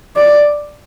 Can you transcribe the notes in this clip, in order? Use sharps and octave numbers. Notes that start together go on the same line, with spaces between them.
D5